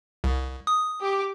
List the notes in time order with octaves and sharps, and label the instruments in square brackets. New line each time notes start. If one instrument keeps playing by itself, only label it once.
[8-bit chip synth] C2
D#6
[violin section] G4 D6